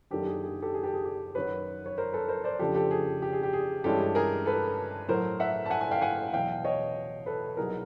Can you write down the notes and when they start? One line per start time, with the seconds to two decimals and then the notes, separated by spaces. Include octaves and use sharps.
0.11 F#2 D#3 F#3 A#3 D4 G4 A4
0.27 G#4
0.43 G#4
0.53 G#4
0.62 G4 A4
0.74 G#4
0.83 G4 A4
0.94 G#4
1.05 G4
1.35 F#2 D#3 F#3 B4 C#5
1.86 C#5
1.98 A#4 C5
2.13 A4 B4
2.28 A#4 C5
2.44 C5 D5
2.59 F2 C#3 F3 A3 D4 G4 A4
2.75 G4 A4
2.91 G#4
3.22 G4
3.33 G#4
3.43 G4
3.53 G#4
3.84 G2 E3 G#3 C#4 E4 G4 A4
4.15 G#4 A#4
4.46 A4 B4
5.09 A2 F#3 A3 A#4 C5
5.40 E5 F#5
5.66 A5
5.70 F#5 G#5
5.81 F#5 G#5
5.91 F5 G5
6.02 F#5 G#5
6.33 E2 B2 F#3 F5 G5
6.65 C#5 D#5
7.26 A4 B4
7.57 C2 B2 F#3 A#3 D#4 G#4 A#4